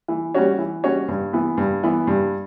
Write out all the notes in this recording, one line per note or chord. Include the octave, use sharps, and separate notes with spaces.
E3
G3 C#4 F#4 C#5
E3
G3 C#4 F#4 C#5
G2
E3 B3
G2
E3 B3
G2